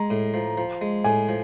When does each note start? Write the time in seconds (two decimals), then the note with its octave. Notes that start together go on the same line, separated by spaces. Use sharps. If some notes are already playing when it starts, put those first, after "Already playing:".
Already playing: G#3 A#5
0.10 A2
0.34 F3
0.57 F3
0.81 G#3
1.04 A2 G#5
1.29 F3